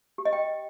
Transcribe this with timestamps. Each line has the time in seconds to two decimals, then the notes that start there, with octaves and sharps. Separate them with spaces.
0.18 G4
0.25 D#5
0.33 G5